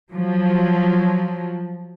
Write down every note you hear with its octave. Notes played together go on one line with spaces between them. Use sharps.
F3 F#3